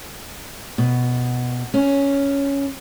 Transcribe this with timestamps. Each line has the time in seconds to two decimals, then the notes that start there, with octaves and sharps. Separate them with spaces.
0.78 B2
1.74 C#4